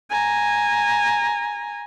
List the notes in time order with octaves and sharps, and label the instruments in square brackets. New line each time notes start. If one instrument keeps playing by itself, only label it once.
[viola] G#5 A#5